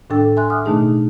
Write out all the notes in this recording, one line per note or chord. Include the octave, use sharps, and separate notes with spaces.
A2 D#3 D4 A4 G5 E6
E5 G#5 C6 F#6
F#5 D6 D#6 F6
B2 D#3 A3 D4 D#4 G#4